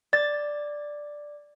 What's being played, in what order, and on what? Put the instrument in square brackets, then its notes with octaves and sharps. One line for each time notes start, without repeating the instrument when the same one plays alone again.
[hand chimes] D5 [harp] A6